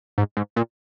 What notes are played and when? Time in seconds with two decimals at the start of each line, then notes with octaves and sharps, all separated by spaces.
0.18 G#2
0.37 G#2
0.56 A#2